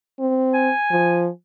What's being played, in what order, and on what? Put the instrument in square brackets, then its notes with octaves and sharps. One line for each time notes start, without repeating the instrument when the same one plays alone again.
[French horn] C4
[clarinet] G#5
[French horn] F3